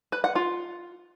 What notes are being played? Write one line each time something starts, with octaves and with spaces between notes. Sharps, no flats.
B4
F#5
F4